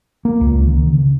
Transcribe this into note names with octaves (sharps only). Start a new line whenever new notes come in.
A#3
C#2
D#3
C#3